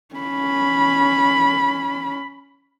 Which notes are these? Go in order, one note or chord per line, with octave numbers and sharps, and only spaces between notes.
C#4 B5